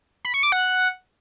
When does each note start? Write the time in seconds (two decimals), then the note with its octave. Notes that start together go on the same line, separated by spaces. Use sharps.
0.25 B5
0.34 C#6
0.43 D6
0.52 F#5